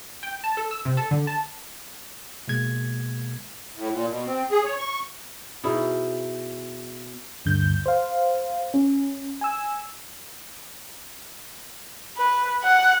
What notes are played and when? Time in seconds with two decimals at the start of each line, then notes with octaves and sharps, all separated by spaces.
0.23 G5
0.44 A5
0.57 A4
0.71 E6
0.85 C3
0.97 A4
1.11 D3
1.27 A5
2.48 B2 G#3 A#3 G#6
3.76 A2
3.91 A#2
4.09 B2
4.26 C4
4.51 G#4
4.64 C#5
4.78 C#6
5.64 B2 D#4 E4 G#4
7.45 D2 G2 D3 G6
7.86 C5 F5
8.74 C#4
9.41 G#5 E6
12.17 B4
12.63 F#5